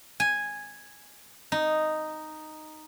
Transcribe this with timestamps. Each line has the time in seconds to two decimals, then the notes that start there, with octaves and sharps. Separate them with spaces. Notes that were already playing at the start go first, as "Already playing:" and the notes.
0.20 G#5
1.52 D#4